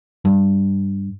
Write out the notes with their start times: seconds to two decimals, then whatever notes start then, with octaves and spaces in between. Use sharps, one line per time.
0.25 G2